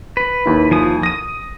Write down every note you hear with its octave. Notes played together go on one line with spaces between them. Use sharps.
B4
D#2 E4
F3 G#5 D#6
D#6 A#6 D#7